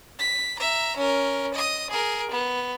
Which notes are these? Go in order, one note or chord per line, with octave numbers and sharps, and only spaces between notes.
B6
E5 A#5
C#4 A#4
D#5 D#6
G#4 A#4
B3